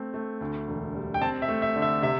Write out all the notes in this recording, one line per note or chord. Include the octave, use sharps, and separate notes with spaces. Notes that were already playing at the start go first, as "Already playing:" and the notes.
Already playing: A3 C4
A3
D2
E1
G3
G5
C4 A5
E5
A3
E5
D3
E5
C3 E5